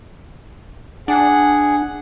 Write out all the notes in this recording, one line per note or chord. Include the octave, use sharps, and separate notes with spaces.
D4 G#4 F#5